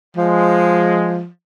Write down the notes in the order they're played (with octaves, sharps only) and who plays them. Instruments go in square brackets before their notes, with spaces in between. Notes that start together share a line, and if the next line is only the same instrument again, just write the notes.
[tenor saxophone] F3 [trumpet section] G#3